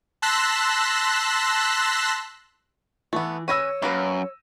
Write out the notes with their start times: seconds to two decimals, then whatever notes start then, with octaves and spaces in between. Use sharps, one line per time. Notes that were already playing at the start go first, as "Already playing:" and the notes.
0.22 A5 C6 E6 F#6 A#6 B6
3.13 E3 A3 B3
3.48 C#4 B4 C#5 G#5 E6 A#6 D#7
3.82 F#2 A#3 A#4 B4